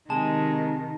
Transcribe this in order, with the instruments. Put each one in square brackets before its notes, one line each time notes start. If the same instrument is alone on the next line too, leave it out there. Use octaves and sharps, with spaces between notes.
[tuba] C3 [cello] D#3 [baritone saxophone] G#3 [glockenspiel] A5